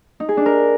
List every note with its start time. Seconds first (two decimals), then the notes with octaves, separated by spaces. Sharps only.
0.20 D#4
0.29 G#4
0.37 D4
0.46 A#4